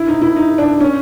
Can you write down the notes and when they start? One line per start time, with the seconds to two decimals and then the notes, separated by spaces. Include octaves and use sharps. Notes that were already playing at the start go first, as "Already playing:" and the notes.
Already playing: E4
0.08 D#4
0.22 E4
0.36 D#4
0.58 D4
0.81 C#4